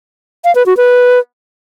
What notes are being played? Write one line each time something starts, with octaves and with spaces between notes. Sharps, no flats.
F5
B4
F#4
B4